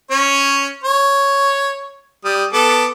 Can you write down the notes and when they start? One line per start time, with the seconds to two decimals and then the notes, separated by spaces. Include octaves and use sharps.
0.11 C#4 C#5
0.84 C#5
2.25 G3 D#6
2.53 B3 A4 D6